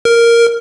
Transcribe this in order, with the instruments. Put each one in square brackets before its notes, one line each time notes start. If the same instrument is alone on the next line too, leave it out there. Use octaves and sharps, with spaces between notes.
[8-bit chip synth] A#4